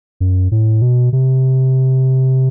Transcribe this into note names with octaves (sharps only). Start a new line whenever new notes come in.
F#2
A2
B2
C3